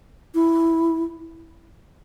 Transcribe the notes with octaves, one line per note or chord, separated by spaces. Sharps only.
E4